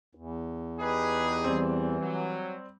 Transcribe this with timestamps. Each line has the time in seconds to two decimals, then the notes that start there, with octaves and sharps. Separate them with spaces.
0.15 E2
0.79 D#4 G4 G#4 B4
1.44 E3 G3 C4
2.02 F#3